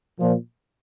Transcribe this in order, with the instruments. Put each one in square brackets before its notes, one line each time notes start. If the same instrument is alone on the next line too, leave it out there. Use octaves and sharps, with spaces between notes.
[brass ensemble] A#2 F3